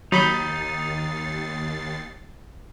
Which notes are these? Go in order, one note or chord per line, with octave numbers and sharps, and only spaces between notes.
D#2 F#3 D#4 B5 G6 A6 C7